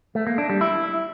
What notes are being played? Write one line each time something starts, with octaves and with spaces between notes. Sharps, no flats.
A3
A#3
D4
G3
E4